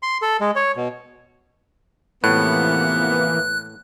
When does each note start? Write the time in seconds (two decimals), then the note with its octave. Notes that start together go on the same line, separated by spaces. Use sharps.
0.03 C6
0.22 A4
0.41 G#3
0.56 C#5
0.76 B2
2.24 A2 C3 E3 F3 A#3 B3 F#6